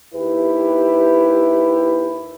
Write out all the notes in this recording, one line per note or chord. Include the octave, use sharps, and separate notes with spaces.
D#2 E4 G4 B4